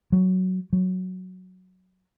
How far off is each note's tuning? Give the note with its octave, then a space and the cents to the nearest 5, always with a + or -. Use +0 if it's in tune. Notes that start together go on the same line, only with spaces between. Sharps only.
F#3 +5
F#3 +0